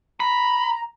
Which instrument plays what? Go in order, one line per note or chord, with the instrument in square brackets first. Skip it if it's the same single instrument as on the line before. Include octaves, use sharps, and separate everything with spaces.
[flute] A#5 [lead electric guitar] B5